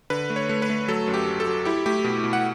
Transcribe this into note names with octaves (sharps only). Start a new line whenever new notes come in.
D3 B4
A3
C#5
A3
B4
A3
F#3 A4
F#2
G4
F#3
A4
F#3
E4 G4
A3 G4
B2
B2
F#5